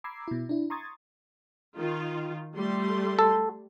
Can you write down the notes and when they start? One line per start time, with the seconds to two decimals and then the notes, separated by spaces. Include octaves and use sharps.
0.04 A#5 B5 D6 E6 G#6 C7
0.28 B2 E4
0.49 D4 E4
0.70 A#5 C6 C#6 D#6 G#6 A6
1.78 D#3 F4
2.56 G3 A3 C6
3.19 A4